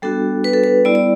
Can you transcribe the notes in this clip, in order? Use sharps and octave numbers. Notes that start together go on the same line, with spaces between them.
G3 B3 D4 F#4 A4
B4
A4
B4
G3 B3 E4 D5
D5